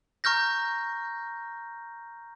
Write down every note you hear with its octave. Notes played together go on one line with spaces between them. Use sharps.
A#5 C#6 F6 G6 A#6